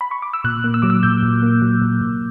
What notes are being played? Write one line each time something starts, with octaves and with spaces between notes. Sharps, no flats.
B5
C#6
D6
E6
A#2 F#6
A#3
E6
F#3 D6
E6
A#2 G6
A#2
A#3
F#3
A#2
A#2